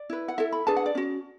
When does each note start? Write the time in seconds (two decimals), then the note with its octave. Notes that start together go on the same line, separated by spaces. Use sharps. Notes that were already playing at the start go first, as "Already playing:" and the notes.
Already playing: D5
0.10 E4 B4
0.28 F#5
0.38 E4 A4 E5
0.52 B5
0.67 D4 G#4 B4 A5
0.76 F#5
0.86 D5
0.95 C#4 F#4